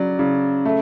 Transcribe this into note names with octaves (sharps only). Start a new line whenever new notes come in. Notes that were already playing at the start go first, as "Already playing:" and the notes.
Already playing: C#3 F#3 D5
C#3
A3